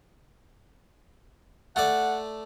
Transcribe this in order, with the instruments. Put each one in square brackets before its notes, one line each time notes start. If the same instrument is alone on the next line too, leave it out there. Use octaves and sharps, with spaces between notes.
[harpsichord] A3 A4 D5 [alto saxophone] F#5